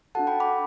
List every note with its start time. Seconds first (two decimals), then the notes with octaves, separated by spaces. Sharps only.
0.15 D4 F#4 A4 F#5 A5
0.27 G5 B5
0.40 B5 D6